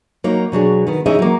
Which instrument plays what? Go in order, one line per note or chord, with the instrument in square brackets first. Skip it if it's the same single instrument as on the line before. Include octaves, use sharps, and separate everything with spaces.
[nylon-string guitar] F#3 A#3 D#4 C#5
B2 F#3 D4 G#4
D#3 B3
E3 C#4 D#4 G#4 D#5 E5
F#3 A#3